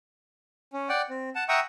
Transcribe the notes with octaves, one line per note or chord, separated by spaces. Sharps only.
C#4
D5 F#5 G5
C4
F#5 A5
E5 F#5 G5 A#5 C#6 D#6